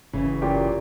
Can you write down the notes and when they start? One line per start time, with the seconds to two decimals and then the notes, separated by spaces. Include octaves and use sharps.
0.13 F#1 C#3 E3
0.42 A#2 G4